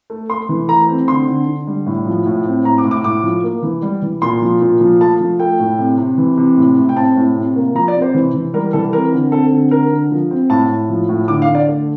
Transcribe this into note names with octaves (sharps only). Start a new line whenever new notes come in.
A3
A3 C6
E3
A3 A#5
C4
D3 C6
D3
D3
G3
A2
F3
A2
C4
A2 A#5
D6
A2
D6
A2 D6
F3
A#3
E3
G3
E3
A#2 C6
F3
A#2
F3
A3 A5
F3
A3 G5
A2
C3
C3
E3
C3
A2
A2
G5
C4 A5
A2
C3
A#3
F3 A#5
D5
C3
C5
E3
E3
G3 A#4
E3 A4
C4 A#4
D3
C4 A4
D3
D3 A#4
D3
F3
C4
A2 A5
A2
F3
A2
D3 D6
F5
D3
D5
A3